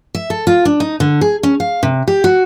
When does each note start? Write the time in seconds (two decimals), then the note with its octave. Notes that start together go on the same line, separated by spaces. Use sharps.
0.15 E5
0.30 A4
0.47 F4
0.65 D4
0.80 D#4
1.00 D3
1.21 G#4
1.43 C#4
1.60 F5
1.83 C3
2.08 G4
2.24 F#4